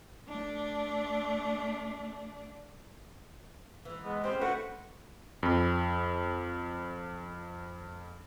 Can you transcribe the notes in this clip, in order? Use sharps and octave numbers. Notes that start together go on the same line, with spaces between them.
A3 D4
G#2 E3
G#3 B3
C4 C#4 G4 C5
A3 D4 F#4 B4 F#5
F2 B5